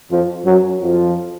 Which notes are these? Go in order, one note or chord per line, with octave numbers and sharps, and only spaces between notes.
F2 F3
F#2 F#3
F2 F3